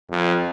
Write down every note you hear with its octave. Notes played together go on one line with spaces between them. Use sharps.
F2